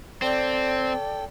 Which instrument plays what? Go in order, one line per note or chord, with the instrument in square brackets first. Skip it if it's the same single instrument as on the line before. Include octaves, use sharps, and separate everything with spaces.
[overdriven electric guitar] C4 [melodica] A4 G5 [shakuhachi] D5